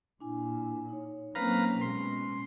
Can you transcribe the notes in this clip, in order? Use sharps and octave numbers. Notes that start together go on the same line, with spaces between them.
A#2 D4 E4 G#5
D#4 C#5
F#3 A#3 C4 C#4 B4 F5 A#5
B2 G#3 C6